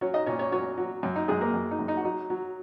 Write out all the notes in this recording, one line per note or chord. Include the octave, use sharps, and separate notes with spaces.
F#3 C#4 C#5
D#4 D#5
A#2 C#4 C#5
C#4 C#5
F#3 C#4 C#5
F#3
F#2 C#4
D#4
F#2 G#3 G#4
A#3 A#4
F#2
D#4
F#2
D#4
F#4
F#3 D#4
F#3